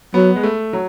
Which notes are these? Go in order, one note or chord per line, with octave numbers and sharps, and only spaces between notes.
F#3 B3
G#3
A3
F#3